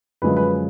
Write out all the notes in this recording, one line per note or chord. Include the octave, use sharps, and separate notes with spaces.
F#2 D3 F3 G#3 C#4 B4
B4